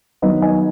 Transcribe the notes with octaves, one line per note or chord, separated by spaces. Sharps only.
D#3 F#3 B3 D#4 B4 D#5
D#5 G#5